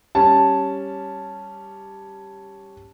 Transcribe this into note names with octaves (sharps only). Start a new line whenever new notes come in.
G3 C#4 A5